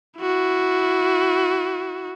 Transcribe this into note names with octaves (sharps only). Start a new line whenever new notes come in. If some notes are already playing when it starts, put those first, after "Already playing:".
E4 F#4